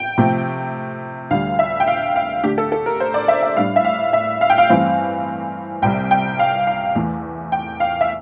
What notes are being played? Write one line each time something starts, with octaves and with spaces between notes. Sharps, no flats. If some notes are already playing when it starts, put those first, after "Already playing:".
Already playing: G5
C3 F3 A3
D2 D3 G3 F5
E5
G5
F5
F5
D3 A3 D4 G4
A4
A4
A#4
C5
D5
E5
E5
A2 G3 D4 F5
E5
F5
E5
F5
G5
F5
G2 E3 A3 C4 F5
C2 C3 G3 G5
G5
F5
F5
E2 E3 A3
G5
F5
E5